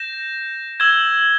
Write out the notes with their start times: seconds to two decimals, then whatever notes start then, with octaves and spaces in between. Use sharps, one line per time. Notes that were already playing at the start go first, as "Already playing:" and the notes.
Already playing: G6 A#6 E7
0.80 E6 G#6 E7 G7